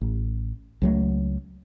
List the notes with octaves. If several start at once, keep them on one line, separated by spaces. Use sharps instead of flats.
A1
C#2 F#3 A3